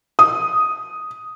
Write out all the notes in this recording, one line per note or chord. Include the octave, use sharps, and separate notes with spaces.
D#6